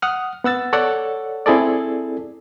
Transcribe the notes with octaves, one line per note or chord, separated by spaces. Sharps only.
F#5 D#6 F6
B3 F#5 E6 A6
A4 C#5 D5 F#5 E6
C4 E4 G#4 A4 D5